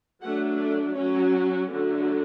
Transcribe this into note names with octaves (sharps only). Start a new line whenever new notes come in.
F#3 A3 D4 F#5
D5
F#3 C#4 C#5
D3 F#3 A3 D4